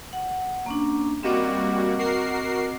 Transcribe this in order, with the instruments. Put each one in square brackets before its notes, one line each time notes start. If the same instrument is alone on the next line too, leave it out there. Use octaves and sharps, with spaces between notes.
[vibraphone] F#5
A#3 C#4 D4
[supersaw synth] G3 A#3 F#4 [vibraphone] C4 D#5 D6
[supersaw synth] F#4 A#4 C7